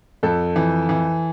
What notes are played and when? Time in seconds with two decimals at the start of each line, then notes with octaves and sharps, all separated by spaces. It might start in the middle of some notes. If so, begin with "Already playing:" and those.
0.23 F2 A4
0.56 E3
0.89 E3